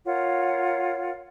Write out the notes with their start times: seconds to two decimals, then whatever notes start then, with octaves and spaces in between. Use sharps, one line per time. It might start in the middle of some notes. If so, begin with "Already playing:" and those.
0.06 F4 A#4 C#5 F#5